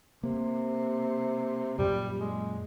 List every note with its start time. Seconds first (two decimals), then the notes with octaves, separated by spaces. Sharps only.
0.23 C3 A#3
1.78 F#2 A#2 G3
2.19 G#3